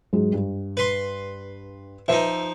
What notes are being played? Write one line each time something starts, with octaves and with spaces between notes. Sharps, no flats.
G#2 F#3 G#3
G2
B4 C6
F3 D#4 B4 E5